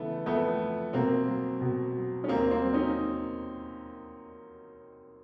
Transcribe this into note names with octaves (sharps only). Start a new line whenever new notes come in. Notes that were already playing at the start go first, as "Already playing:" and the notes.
Already playing: C#3 E3 A3 B3
F2 A3 B3
F2
B2 A#3 C4
F#3
B2
F#3
C#4
D#2 A#3 C4
A#3 C4
F#3
C#4 D#4